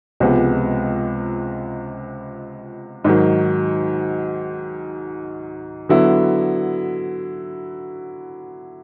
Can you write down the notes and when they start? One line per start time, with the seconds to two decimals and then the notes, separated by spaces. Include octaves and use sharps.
0.20 C#2 C3 F3 G#3 B3
3.05 G#2 D#3 F#3
5.89 D3 F#3 B3 E4